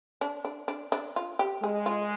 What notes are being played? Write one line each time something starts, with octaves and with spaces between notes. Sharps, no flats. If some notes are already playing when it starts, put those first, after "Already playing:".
D4
D4
D4
D4
F4
G4
G#3 G#4
F4